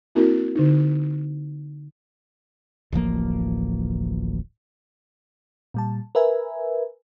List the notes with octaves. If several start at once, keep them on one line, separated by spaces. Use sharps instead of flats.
A#3 C4 E4 F#4 A#4
D3 D#4
D1 A1 F3 A#3
A#2 G3 A5
A#4 B4 E5 G#5